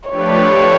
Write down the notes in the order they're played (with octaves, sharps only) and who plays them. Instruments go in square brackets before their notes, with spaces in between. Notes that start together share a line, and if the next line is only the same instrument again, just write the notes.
[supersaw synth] F3 A3 D4 G4 B4 [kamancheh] C#5